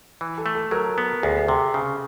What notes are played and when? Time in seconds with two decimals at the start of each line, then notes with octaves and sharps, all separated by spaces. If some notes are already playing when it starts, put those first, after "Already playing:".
0.21 E3
0.38 A4
0.46 A3
0.55 A4
0.71 F#3 A#4
0.98 B3
1.23 D2 G#4
1.48 C3
1.74 C#3